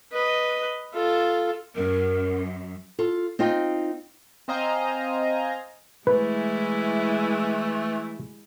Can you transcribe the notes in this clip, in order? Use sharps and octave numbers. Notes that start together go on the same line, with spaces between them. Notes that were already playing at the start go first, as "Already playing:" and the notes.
B4 D#5
F4 A4
F#2 A#4
F4 A4
C4 D#4 F4 D#5 G5
C4 C5 D#5 F5 G#5 A#5
E3 G#3 A3 E4 B4